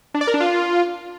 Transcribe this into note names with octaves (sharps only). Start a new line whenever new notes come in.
D4
D5
A#4
D4
F4